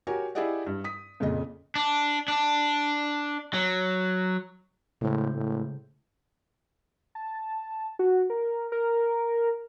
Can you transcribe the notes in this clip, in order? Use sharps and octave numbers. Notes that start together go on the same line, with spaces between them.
F#4 G4 A#4 C#5 G#5
E4 G4 G#4 D5 D#5 F#5
G2
D#6 B6
F2 A#2 C#3 D#5
D4
D4
F#3
A2 C#3 G#3 C5
A2
A5
F#4
A#4
A#4